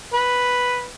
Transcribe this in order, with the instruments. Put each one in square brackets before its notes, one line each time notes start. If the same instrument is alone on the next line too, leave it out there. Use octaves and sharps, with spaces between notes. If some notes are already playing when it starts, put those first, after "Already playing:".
[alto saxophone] B4